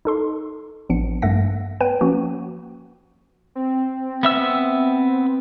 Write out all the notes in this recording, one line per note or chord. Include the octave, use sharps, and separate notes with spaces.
D#4 A4 C6
A1 F3 B3 D4 C#7
G2 A3 A#3 E5 F#5 A#6
B3 B4 G5 D#7
F3 A#3 C#4 F#4
C4
B3 E5 E6